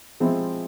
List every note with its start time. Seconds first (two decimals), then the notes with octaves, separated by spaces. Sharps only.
0.20 F3 G#3 C4 E4